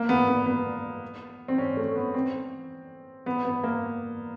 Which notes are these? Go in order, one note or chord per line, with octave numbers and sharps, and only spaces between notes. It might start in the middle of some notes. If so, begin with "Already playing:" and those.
Already playing: A#3
B3
B3
B3
C4
C#4
A3
B3
C4
B3
B3
A#3